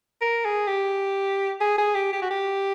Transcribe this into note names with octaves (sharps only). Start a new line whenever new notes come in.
A#4
G#4
G4
G#4
G#4
G4
G4
F#4
G4